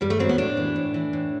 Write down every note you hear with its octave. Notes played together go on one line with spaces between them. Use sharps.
G2 G3
A3
F#3 C4
B3
A2 D4
E3
A2
E3
A2